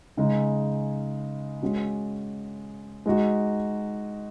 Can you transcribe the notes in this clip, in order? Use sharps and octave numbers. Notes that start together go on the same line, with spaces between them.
C#3 G#3 D#4
G#3 C#4 F#4
G#3 D#4 F#4